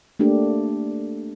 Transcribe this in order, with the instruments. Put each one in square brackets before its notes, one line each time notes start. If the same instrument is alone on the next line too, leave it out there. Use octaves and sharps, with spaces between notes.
[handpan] A3 A#3 D4 G4